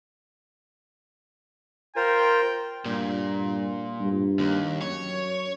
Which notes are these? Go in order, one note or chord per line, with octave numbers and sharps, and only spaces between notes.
F4 A#4 C5 G5
G2 A#2
G2
D#2
F#2 C#5